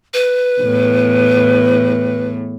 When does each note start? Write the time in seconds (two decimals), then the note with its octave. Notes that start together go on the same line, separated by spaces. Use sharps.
0.14 B4
0.61 E2 A2